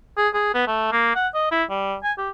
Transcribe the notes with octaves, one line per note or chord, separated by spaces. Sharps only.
G#4
G#4
B3
A3
A#3
F#5
D#5
E4
G3
G#5
G4